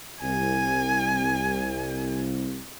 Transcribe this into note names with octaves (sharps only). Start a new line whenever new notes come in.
C2 G#5